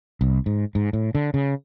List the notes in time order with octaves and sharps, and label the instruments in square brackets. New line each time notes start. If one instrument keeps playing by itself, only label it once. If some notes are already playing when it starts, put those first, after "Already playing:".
[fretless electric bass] C2
G#2
G#2
A2
D3
C#3